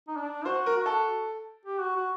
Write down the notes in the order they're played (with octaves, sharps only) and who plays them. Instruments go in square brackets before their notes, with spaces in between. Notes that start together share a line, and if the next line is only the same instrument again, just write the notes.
[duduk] D#4
D4
[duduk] F#4 [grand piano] C5
[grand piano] A#4
[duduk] F#4
[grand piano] A4
[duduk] G4
F#4
F#4